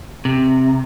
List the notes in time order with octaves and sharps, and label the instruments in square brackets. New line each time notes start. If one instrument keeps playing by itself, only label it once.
[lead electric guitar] C3